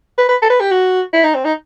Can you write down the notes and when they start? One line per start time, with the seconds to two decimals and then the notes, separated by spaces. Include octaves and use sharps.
0.18 B4
0.29 B4
0.42 A4
0.50 B4
0.61 G4
0.71 F#4
1.13 E4
1.24 D#4
1.35 C4
1.45 D#4